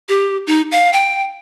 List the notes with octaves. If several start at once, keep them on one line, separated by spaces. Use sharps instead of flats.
G4
D#4
F5
G5